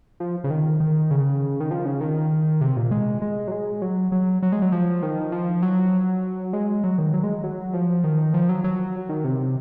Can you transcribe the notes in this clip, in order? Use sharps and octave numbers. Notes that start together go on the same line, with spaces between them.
F3
C#3
D#3
D#3
C#3
D#3
F3
C#3
D#3
C3
A#2
G#3
G#3
F#3
G#3
F#3
F#3
F#3
G#3
F#3
F3
D#3
F3
F#3
G#3
F#3
D#3
F#3
G#3
F#3
F3
D#3
F3
F#3
F#3
D#3
C3